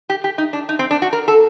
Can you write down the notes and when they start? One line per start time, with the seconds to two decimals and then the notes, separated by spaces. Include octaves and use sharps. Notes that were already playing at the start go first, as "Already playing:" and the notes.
0.10 G4
0.24 G4
0.38 D#4
0.53 D4
0.69 D#4
0.79 C4
0.91 D4
1.02 F#4
1.13 A#4
1.28 A4